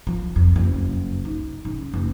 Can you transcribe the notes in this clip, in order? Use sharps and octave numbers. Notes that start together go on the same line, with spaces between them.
F3
F2
F#1
D#4
C#3
F#1